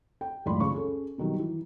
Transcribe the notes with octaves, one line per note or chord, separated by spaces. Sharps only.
G5
C#2 F#2 A2 D5 B5 C6
C#3 C#6
C#4 G#4 A4
B2 D#3 F#3 G3
E3